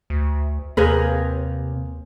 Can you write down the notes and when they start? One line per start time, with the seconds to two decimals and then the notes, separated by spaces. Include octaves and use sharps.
0.10 D2
0.77 D#2 C3 G#4 A#4 B4 F5